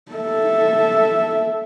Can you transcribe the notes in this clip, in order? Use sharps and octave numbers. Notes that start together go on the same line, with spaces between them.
A4 E5